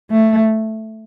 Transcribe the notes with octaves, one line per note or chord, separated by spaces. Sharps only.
A3